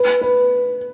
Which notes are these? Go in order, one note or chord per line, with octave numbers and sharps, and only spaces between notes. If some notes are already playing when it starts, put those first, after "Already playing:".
Already playing: B4
B4